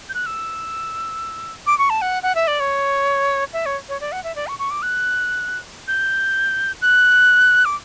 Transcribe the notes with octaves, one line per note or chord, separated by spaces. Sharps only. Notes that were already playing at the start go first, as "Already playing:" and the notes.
G6
F#6
E6
D6
C#6
A5
F#5
F#5
E5
D5
C#5
E5
C#5
C#5
D5
F#5
E5
D5
C#6
C#6
D6
F#6
G6
F#6
D6